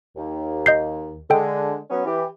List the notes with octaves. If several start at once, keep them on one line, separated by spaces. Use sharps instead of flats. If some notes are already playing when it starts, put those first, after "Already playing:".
D#2
D#5 G6 C7
D3 G#3 A4 G5
F#3 B3 C#4
E3 G4